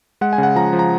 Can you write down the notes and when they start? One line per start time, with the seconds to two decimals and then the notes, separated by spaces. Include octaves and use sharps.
0.21 G#3 F#5
0.33 G#5
0.38 C#3
0.43 F#5
0.56 F3 A#5
0.73 F3
0.79 A#5